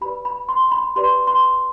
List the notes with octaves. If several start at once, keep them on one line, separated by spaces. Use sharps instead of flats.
G4 B4 D5 B5
B5
C6
B5
G4 B4 D5 C6
C6